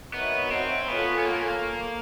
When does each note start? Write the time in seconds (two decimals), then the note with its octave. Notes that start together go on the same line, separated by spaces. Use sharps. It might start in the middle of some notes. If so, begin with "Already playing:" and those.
0.14 B3 D#4 F#4 A#4 C#5 E5
0.51 C4
0.88 B3 F4 A4 C#5 F5 G#5
1.19 B3
1.25 A#3